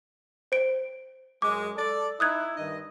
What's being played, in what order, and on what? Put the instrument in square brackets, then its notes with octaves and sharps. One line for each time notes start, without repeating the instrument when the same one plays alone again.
[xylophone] C5 D7
[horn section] F#2 G#3 [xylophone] D6
[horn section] A4 D5
[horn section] D#4 E4 [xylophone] D#6 F#6 G#6
[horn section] G2 D#3 D#5